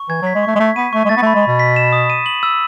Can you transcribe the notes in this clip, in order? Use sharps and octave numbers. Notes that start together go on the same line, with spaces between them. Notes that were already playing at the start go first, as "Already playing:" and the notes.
Already playing: C#6
E3 G#6
F#3
B6
G#3
A3 C#6
G#3
A3 B6
B3 D#7
A3 C#6
G#3
A3 A6
B3
A3
B5
G#3
B2 B5
B6
E7
D#6
D#7
F#7
E6